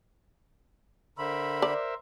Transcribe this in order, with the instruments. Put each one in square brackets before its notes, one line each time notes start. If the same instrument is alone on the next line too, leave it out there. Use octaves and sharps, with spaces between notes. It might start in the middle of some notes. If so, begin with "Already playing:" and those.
[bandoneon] D3 B5 [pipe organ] A#4 C5 E5
[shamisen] D5